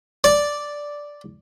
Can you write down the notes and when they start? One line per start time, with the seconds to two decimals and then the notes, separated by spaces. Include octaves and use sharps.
0.24 D5